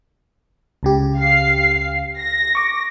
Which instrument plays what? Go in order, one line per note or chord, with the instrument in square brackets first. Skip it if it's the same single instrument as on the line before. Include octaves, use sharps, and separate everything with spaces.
[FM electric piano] C#2 C#3 G4
[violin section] F5 C7
A#6
[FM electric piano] C#6 D6